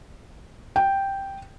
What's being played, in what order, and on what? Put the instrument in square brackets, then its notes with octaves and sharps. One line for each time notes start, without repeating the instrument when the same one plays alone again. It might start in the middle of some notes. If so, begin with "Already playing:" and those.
[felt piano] G5